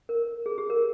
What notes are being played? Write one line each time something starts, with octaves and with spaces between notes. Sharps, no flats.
A#4
G#4
G4
A#4